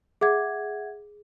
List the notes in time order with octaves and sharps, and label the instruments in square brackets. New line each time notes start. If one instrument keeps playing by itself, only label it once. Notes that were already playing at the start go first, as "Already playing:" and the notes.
[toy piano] G#4 [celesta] E5 F#5 G#6